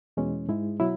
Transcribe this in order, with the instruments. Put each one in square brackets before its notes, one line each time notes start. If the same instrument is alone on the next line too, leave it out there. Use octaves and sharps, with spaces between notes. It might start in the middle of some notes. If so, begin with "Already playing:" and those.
[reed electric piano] E2 B2 G#3 C#4
G#2 G#3 E4
B2 F#3 E4